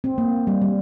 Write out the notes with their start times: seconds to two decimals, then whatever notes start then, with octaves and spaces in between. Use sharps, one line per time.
0.04 C4
0.18 A#3
0.47 G3
0.62 G3